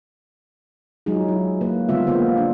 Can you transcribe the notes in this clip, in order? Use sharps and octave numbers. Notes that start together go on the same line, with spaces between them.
F#3 G#3 D#4 F4 G#4
E4
A#3 B4
D3 G3 G#3 B3 F4 E5
A#3 B3 F4 C5
D4